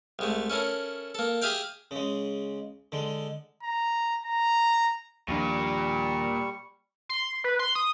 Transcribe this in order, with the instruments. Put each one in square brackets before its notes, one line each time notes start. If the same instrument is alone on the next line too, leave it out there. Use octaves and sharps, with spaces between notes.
[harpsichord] C2 G#3 A3
C#4 E4 A4 A#4
A#3 A4
G4 G#4 E5 F5 G5
C#3 G#3
D3 G#3
[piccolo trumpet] A#5
A#5
[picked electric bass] D#2 F3 D4 [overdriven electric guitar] A#2 F4 [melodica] G3 C#6
[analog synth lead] C6
B4
C6
D#6